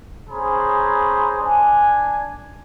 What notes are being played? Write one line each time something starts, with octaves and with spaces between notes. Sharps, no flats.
C#4 G#4 C5 A#5 B5
D4 G#5